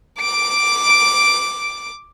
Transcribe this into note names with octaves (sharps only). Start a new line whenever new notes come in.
D6 D7